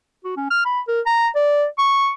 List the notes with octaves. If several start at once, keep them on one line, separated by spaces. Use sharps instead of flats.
F#4
C#4
F6
B5
A#4
A#5
D5
C#6